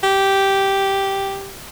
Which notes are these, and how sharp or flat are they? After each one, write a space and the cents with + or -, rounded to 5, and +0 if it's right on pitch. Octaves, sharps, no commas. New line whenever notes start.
G4 -5